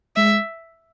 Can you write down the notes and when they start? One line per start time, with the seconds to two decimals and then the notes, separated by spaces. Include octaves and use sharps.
0.16 G#3 E5